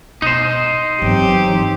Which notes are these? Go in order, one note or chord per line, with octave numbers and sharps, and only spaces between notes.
B2 D#4 C5
G1 D#3 E3 F#3 C4 G4